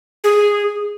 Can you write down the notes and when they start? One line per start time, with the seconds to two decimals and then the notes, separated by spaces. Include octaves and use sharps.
0.24 G#4